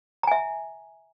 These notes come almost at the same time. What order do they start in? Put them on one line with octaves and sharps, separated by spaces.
A#5 G#5 E5